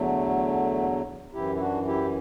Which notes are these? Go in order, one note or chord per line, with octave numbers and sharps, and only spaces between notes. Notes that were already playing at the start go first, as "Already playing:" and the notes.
Already playing: E2 D3 F#3 A3
F#2 E3 E4 G4
E4
D4 F#4
E4 G4